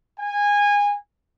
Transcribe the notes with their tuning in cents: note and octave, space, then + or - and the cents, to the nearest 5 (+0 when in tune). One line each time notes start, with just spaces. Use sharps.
G#5 -20